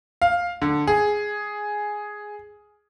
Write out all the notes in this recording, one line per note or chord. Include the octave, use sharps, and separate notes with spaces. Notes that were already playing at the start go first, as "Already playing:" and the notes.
F5
D3
G#4